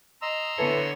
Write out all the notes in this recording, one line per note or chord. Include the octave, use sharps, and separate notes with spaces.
D#5 A#5 C6 E6
D3 E3 B3 A4 C#5